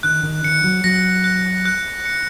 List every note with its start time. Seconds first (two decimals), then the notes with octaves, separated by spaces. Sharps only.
0.03 D#3 F#6
0.23 D#3
0.44 D#3 C#7
0.64 F#3
0.84 F#3 A#6
1.24 F#6
1.65 F#6
2.05 C#7